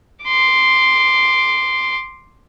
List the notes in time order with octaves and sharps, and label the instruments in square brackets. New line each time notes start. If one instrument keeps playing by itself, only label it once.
[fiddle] C6 D6